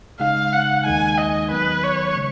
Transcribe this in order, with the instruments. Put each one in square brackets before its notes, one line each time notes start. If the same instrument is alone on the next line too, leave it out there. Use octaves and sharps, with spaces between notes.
[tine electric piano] C#3 G#3 D#4 [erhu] F5
[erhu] F#5
[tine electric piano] D#2 D#3 G#3 D#4 [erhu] G#5
[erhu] D#5
[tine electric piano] D#3 F#3 B3 [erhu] B4
[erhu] C#5
[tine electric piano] C#3 G#3